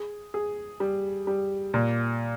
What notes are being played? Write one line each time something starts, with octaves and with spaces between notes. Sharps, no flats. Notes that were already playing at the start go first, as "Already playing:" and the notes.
Already playing: G#4
G#4
G3
G3
A#2